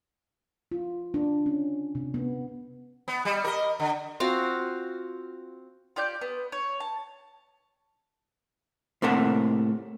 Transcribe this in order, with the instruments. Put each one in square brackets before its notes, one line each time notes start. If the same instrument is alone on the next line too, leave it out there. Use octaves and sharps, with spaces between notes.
[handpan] F4
D4
C#4
C3
B3
[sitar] B3
G3
A#4 D#5
D3
[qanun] C4 F4 F#4 F5
[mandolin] F4 G4 D5 G6
B3
C#5
A5
[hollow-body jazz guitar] A2 C3 A#3 A4 F#5